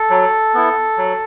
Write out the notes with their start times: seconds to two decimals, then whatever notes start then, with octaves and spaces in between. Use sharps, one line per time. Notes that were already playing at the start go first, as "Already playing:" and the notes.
Already playing: A4
0.10 F#3
0.54 B3 E4
0.98 F#3